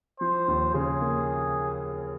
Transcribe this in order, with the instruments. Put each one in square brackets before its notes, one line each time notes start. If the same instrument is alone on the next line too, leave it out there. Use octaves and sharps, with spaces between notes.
[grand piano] F3 [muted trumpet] C5
[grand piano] D#2
[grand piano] C#3 [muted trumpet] G#4
[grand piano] A#3